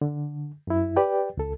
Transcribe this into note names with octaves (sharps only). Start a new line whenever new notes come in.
D3
F#2 E4
G4 B4 D5 G5
C#2 A4